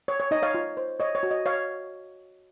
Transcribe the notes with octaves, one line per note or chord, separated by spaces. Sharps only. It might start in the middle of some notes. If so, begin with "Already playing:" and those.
C#5
C#5
D#4 D#5
C#5 F5
F4
C5
C#5 D#5
C#5
F#4
D#5
C#5 F5